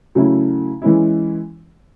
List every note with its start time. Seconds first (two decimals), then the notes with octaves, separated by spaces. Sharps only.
0.15 C#3 F#3 A3 C#4 E4
0.82 E3 G#3 C#4 E4